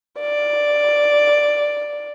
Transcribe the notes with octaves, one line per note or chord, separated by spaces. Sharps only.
D5